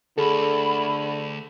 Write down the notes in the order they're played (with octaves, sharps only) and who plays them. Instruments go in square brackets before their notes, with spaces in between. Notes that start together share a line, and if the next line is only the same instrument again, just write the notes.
[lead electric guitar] D2 [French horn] D3 [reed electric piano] G#4 A4 [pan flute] B5